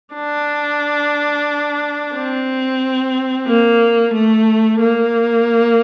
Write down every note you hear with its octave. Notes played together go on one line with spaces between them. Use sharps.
D4
C4
A#3
A3
A#3